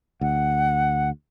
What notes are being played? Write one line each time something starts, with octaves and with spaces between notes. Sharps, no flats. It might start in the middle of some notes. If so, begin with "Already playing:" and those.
D2 F#5